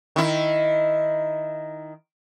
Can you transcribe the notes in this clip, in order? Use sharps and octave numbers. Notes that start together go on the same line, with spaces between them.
D#3 E4